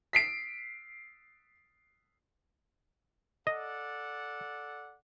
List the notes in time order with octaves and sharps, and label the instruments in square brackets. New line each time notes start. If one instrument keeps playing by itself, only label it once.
[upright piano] B6 C7 D7
[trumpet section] A4 D5 F#5 [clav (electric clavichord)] D#5